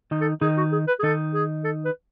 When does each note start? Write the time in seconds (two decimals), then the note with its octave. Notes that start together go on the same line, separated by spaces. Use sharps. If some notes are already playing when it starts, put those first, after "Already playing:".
0.11 D#3 D#4
0.21 A4
0.41 D#3 D#4 G#4
0.57 F#4
0.72 G#4
0.88 B4
0.99 G#4
1.03 D#3 D#4 A4
1.34 G#4
1.64 A4
1.85 B4